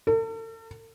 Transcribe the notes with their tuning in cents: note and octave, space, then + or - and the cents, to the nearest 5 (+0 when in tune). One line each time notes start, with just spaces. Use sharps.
A4 +45